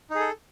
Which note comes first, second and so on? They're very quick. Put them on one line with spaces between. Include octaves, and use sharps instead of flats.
D#4 G#4 A4